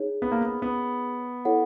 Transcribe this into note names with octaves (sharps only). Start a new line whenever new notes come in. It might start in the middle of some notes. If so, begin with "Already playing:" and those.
Already playing: D#4 G#4 C#5
B3
A#3
B3
B3
E4 A4 C#5 F#5